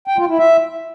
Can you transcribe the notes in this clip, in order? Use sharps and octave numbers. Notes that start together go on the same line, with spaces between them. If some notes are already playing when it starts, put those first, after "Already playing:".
G5
F4
E4
E5